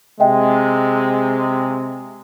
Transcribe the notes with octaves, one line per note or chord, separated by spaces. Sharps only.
C3 G#3 D#5 E5 G5